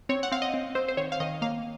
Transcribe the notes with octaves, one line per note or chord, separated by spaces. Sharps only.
C4 C#5
F#5
C4 F5
D#5
C4
C4 C5
C5
D#3 C#5
F5
D#3 D#5
A#3 F5